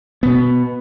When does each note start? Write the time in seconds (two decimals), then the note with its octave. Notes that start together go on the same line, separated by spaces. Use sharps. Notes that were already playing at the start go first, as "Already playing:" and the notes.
0.23 B2 B3